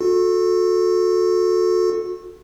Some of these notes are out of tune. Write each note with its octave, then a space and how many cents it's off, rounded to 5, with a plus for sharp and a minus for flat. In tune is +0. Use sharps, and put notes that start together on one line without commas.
F#4 -35 A4 +0